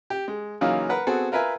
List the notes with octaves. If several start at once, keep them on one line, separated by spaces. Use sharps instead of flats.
G4
G#3
C#3 E3 F#3 A#3 D#4 F4
A#4 B4 F#5
B3 C4 F#4 G#4 A4
F4 A#4 B4 E5 G#5